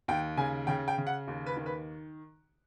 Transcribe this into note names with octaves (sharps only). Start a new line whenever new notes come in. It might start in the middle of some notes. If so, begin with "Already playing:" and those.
D#2 G5
C#3 G#5
C#3 G5
G5
C#3
F#5
D#2
B4
D#3
B4